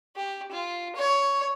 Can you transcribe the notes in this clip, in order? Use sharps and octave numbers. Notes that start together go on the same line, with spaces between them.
G4
F4
C#5